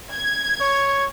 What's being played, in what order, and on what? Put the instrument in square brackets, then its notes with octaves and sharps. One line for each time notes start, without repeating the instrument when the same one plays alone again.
[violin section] G#6
[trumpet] C#5